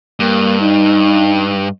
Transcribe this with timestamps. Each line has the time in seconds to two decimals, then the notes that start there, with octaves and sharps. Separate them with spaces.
0.20 G2 A#3
0.61 D#4